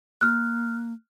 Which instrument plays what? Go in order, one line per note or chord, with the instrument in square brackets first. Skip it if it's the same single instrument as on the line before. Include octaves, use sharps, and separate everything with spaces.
[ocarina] A#3 [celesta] F6 F#6